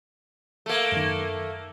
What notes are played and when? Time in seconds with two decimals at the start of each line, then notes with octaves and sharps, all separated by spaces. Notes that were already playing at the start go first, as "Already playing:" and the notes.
0.66 A3 A#3
0.92 F#2 D#3